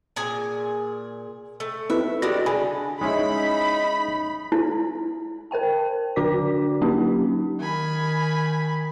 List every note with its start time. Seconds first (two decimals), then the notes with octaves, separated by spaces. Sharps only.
0.16 A#2 G#4 G#5
1.60 A3
1.90 C4 E4 B4 E5
2.22 G3 G#3 D4 F#4 A#6
2.46 D3 G#4 G#5 B5
3.01 G#3 C#4 D#4 E4 B5
4.52 E4
5.51 A#4 C5 G5 A5
6.16 D3 D4 F#4 D5 D6 B6
6.81 F#3 A#3 C#4 D#4 G4
7.60 D#3 G#5 B5